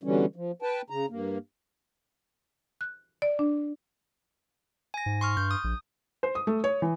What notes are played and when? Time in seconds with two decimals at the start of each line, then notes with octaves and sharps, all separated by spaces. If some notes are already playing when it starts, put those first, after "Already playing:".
0.03 B2 D3 E3 G3 C#4
0.36 F3
0.62 B4 G5 A5
0.90 C#3 A#5
1.09 G2 A#3
2.81 F#6
3.22 D5
3.39 D4
4.94 G#5 A#6
5.06 G#2
5.21 C6 C#6 F6
5.37 G2 G6
5.51 D#6
5.64 A#1
6.23 C5
6.35 D#6
6.47 A3
6.64 C#5
6.82 E3